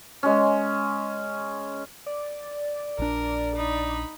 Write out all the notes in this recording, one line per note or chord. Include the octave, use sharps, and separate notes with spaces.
G#3 C#4
D5
A#1 D4 A#4
D#4 B5